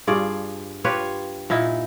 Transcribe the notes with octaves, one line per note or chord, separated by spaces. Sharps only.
G2 F4 G#4 D5
F4 G4 B4 C#5
A#2 D#4 E4